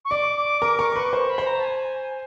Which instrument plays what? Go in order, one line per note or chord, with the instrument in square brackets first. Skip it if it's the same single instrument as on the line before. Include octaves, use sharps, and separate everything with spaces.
[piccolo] C#6
[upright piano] D5 [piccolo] D6
[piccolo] D6
[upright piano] A#4 [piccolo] D6
[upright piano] A#4 [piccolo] C#6
[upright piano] B4 [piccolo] C#6
[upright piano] C5 [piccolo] C#6
[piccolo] B5
[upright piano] C5
[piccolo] A#5
A5
G#5